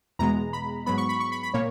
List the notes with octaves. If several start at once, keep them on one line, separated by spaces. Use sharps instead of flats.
E2 B2 G#3 B3 A#5
B5
G#2 F#3 B3 B5
C#6
B5
C#6
B5
B5
A#2 A#3 C#5